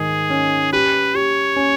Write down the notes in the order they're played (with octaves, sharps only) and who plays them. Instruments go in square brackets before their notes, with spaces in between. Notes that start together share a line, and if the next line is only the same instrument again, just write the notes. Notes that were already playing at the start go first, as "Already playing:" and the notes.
Already playing: [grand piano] G#2 D#3 G#3 [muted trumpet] G#4
[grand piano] C#4
[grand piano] G4 [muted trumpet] B4
[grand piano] G4 [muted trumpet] C#5
[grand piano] C#4